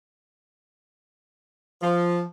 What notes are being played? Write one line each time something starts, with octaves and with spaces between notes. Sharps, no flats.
F3